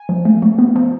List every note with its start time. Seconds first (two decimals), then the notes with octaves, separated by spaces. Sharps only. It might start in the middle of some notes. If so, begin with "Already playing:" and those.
Already playing: G#5
0.09 F3
0.25 A3
0.42 A3
0.59 B3
0.76 F3